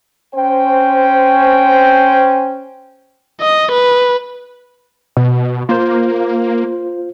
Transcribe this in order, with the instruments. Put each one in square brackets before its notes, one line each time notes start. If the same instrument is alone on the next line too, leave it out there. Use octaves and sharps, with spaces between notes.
[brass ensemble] C#4 C5 G5
[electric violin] D#5
B4
[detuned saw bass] B2
[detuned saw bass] A#3 [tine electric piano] F4 C5